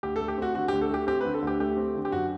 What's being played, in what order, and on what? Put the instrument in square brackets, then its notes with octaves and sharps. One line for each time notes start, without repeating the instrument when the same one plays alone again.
[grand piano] D2 G4
A4
A3
G4
C4 F#4
D3 F#4
G4
D2
A4
A3 G4
C4 G4
B4
D3
A4
D2
G4
A3 G4
C4
D3
G4
F#2 F#4